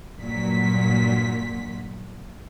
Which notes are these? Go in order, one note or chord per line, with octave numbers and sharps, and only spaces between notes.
G2 A#2 F#3 B6